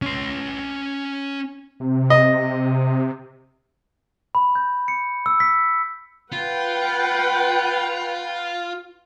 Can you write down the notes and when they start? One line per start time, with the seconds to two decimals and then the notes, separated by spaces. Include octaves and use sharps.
0.02 C#4 C6
1.80 C3
2.10 D#5
4.35 B5
4.55 G6
4.88 C#7
5.26 E6
5.40 B6
6.32 F4 B4 F#5 G5